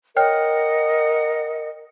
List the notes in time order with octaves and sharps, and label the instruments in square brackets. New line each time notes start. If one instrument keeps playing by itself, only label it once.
[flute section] A#4 D#5 F#5 [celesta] C#5 G5 F6